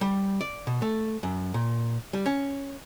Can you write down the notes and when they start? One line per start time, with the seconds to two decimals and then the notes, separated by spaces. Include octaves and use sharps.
0.01 G3
0.41 D5
0.67 B2
0.82 A3
1.23 F#2
1.54 A#2
2.13 G3
2.26 C#4